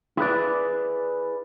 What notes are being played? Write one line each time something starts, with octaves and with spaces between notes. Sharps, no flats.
E4 G#4 B4 D5